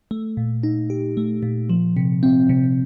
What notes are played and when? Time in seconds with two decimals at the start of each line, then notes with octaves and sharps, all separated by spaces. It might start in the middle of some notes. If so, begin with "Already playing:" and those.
0.11 A3
0.37 A#2
0.63 D#4
0.90 G4
1.17 A3
1.43 A#2
1.70 F3
1.97 C3
2.23 C4
2.49 C3